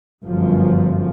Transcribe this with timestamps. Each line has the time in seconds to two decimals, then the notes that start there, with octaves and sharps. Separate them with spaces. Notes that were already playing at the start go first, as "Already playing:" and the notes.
0.24 G1 F#2 F3